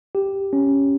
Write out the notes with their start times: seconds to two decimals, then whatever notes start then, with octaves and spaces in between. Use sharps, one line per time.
0.15 G4
0.53 C#4